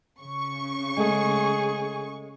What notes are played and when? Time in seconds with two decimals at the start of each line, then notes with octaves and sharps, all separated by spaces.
0.20 C#3 C#6
0.97 G#3 A3 G#4